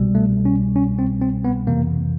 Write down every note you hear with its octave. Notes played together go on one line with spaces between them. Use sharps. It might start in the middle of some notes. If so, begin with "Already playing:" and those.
Already playing: C2 B2 G3
A3
C#4
C#4
C4
C4
B3
F2 C3 E3 A#3